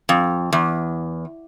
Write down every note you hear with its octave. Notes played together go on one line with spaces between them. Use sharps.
F2
E2